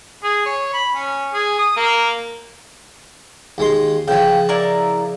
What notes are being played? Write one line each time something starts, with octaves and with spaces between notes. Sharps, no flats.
G#4
C#5
B5
C#4
G#4
D#6
A#3
D#2 G#3 C6
C#3 F3 G5 G#5
E4 A#4 D5